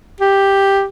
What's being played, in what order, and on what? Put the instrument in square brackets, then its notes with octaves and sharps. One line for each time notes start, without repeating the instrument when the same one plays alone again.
[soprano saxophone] G4